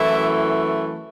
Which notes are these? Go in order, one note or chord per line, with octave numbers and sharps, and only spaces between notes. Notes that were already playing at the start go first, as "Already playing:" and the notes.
Already playing: F#2 E3 A3 E4